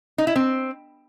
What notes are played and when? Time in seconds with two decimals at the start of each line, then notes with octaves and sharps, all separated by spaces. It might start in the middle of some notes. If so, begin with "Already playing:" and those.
0.18 D#4
0.27 E4
0.36 C4